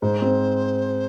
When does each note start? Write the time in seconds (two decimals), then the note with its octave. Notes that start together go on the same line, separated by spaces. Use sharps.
0.02 G#2 C5
0.21 C4